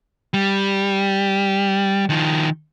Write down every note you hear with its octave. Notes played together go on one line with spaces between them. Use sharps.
G3
D#3 F3